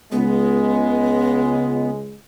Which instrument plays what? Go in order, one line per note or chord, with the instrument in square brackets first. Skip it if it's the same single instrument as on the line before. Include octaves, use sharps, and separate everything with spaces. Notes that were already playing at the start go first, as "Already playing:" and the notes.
[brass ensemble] C#2 G#3 [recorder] B3